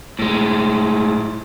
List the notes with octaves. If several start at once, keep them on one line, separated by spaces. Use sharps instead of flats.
A2 G#3